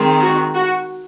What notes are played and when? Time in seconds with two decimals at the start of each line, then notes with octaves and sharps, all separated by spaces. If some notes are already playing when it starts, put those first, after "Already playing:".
Already playing: D#3 G#3 C4
0.21 F#4
0.55 F#4